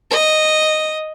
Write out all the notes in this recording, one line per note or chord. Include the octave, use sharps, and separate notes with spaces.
D#5